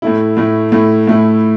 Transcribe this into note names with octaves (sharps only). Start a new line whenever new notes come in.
A2 A3 E4
A2 A3 E4
A2 A3 E4
A2 A3 E4